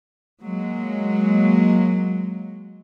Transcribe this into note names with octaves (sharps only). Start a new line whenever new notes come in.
F#3 G#3 A#3